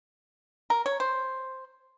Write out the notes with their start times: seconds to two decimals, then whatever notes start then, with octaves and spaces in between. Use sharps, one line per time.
0.70 A#4
0.86 C#5
1.00 C5